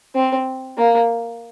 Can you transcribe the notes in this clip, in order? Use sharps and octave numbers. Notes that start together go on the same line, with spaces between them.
C4
A#3